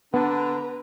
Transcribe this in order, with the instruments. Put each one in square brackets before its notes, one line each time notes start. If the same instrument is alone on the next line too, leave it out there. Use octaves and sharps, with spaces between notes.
[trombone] D3 [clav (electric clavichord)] B3 [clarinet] D4 [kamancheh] B4 A#5